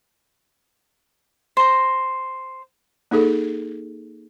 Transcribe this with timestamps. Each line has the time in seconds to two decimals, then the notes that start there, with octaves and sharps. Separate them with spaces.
1.57 C5 A#5
3.11 A#3 D#4 G#4 A4